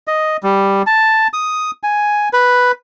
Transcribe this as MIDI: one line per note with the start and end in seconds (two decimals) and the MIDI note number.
0.08 0.37 75
0.43 0.82 55
0.87 1.28 81
1.33 1.71 87
1.83 2.29 80
2.33 2.72 71